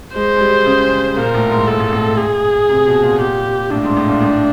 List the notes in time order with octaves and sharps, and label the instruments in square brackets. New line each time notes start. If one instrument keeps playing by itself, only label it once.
[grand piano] G#3 [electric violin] C5
[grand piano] G#3
G3
C#3
[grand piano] A#2 [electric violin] A#4
[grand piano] A2
G#2
[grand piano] G#2 [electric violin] A4
[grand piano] A2
A2
[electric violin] G#4
[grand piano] C3
B2
A#2
[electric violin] G4
[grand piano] A2 [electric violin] D4
[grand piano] G#2
A2
A#2
A2